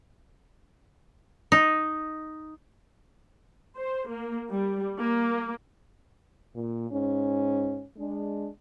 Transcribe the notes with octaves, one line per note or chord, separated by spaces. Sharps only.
D#4
C5
A#3
G3
A#3
A#2
G#2 C#4
G#3 D4